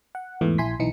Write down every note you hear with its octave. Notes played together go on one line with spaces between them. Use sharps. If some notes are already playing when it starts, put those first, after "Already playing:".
F#5
E2 G#2 E3 A3
A#1 E4 G#5 C6 B6
B1 E3 D#4 C#7